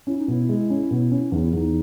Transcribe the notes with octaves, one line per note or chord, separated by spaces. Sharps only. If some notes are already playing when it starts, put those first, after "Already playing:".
C#4 E4
D#4
B2 E4
G#3
C#4
B2
C#4
E2 D#4
E4
E2 D#4